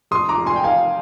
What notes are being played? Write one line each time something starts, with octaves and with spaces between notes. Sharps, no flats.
F1 C6 D#6
A#5 D6
F1
G#5 C6
G5
D#3 F5 G#5